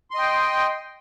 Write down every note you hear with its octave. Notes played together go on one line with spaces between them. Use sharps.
D#5 G5 C6